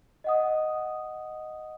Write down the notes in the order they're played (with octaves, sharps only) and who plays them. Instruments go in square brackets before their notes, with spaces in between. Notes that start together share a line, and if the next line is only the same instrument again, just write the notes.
[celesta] D#5 F#5 D#6